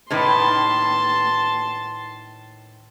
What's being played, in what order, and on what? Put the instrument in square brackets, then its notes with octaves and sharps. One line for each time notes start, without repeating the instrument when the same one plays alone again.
[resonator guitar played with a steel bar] A2 D#3 B4 [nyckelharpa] A5 C6